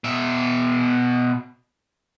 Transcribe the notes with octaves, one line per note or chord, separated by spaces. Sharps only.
B2 E5